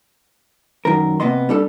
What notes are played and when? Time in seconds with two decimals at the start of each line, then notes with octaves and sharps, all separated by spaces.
0.85 F#2 D#3 A#4
1.20 C3 A#3 B3 D#5 C6
1.49 G3 D4 A4